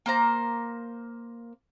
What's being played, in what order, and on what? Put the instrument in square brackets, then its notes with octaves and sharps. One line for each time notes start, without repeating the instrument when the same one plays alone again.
[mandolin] A#3 C5 A#5